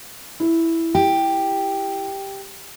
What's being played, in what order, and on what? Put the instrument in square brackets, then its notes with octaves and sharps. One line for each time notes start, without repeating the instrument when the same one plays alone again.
[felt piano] E4
[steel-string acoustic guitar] G4